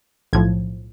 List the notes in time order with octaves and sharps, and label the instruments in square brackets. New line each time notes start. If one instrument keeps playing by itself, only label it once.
[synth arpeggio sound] B1 A2 F3 G#6